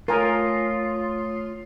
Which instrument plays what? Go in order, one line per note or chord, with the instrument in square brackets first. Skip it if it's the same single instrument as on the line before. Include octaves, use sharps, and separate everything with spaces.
[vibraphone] A3 C#5 D#6 [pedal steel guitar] F4 [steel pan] A#4 G#5